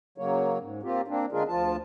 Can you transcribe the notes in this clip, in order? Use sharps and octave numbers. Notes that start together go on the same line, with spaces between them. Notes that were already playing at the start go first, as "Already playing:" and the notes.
C#3 F#3 A#3 C#5
G#2
A#3 C4 F4 G4
A#3 C4 D4
D3 G#3 D4 F4 G#4 A#4
D2 F3 F4 A5